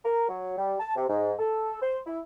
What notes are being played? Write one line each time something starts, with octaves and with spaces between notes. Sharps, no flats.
A#4
F#3
G3
A5
C3
G#2
A4
C5
E4